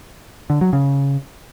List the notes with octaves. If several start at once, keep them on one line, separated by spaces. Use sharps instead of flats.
D3
F#3
C#3